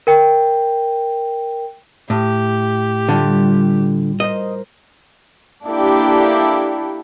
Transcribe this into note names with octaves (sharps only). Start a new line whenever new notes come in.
A#4 G5
A2 G4
A2 D3 G3 F4
A#4 C5 D#5
A#3 D4 E4 G4 A4